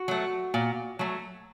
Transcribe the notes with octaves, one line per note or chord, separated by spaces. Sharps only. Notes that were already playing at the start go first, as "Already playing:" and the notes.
Already playing: F#4
F#3 A3
A#2
F#3 A3